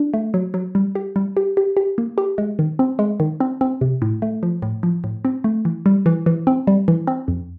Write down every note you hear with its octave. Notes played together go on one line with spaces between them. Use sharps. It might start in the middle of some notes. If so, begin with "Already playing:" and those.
Already playing: D4
A3
F#3
F#3
G3
G4
G3
G4
G4
G4
A#3
G4
G#3
D#3
C4
G#3
D#3
C4
C4
C3
A2
A3
F3
A2
F3
A2
C4
A3
E3
G3
E3
E3
C4
G3
E3
C4
F2